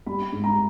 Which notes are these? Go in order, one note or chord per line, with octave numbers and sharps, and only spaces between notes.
G3 B5
G#2
A#5